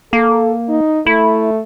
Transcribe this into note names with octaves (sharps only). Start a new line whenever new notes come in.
A#3 A4
D#4
A3 E4